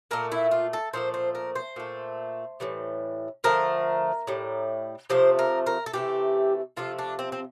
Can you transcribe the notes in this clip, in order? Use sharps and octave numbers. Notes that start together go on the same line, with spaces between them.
A#2 A3 A#4
E4
F4
A4
A#2 F3 A3 C5
C5
A#4
C5
A#2 A3
A2 E3 G3
D3 F3 A3 A#4
A2 G3
C3 F3 A3 C5
A#4
A#4
A4
C3 E3 A3 G4
C3 F3 A3 F4
D4
C4
C4